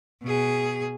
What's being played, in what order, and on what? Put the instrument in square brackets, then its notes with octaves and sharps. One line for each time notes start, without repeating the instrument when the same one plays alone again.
[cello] B2 G#4